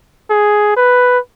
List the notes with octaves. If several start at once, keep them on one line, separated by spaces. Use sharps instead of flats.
G#4
B4